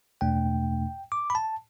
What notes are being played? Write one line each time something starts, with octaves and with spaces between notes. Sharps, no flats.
E2 B2 A3 D4 G5
D6
B5
A5